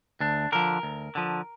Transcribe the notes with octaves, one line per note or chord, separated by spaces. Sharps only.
D2 D4
D3 F3 A#4
D2
D3 F3